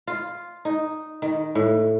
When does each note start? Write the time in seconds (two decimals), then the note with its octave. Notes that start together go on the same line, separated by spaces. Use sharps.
0.07 F4
0.65 D#4
1.22 D#3
1.55 A2